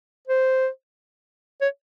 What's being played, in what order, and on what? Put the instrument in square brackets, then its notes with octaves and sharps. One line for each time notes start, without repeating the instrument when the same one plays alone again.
[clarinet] C5
C#5